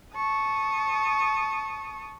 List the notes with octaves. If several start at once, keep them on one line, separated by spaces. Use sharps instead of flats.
A5 C#6 D#6